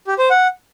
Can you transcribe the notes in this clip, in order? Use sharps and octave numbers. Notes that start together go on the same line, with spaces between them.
G4
C5
F#5